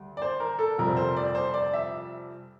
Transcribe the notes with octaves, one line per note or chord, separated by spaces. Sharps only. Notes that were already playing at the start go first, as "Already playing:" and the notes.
Already playing: D2 G3
D5
C5
A#4
A4
F1 F2 C3 G3 A#4
C5
D5
C5
D5
E5